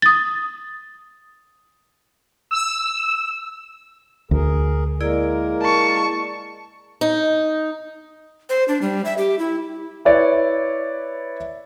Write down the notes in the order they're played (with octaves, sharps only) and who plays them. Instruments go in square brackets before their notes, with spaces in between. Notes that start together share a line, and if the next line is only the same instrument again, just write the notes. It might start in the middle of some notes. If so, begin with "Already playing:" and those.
[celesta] D#6 A6
[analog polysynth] E6
[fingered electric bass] D2 [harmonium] G#4 A#4
[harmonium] G#3 A#3 A#4 [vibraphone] E4 G#4 D5
[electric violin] A5 C#6
[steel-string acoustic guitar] D#4
[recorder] C5
D4
G3
E5
G4
E4
[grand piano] E4 B4 C#5 D5